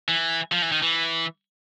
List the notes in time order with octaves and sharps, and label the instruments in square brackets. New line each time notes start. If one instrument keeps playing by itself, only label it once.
[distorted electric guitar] E3
F3
E3
D#3
E3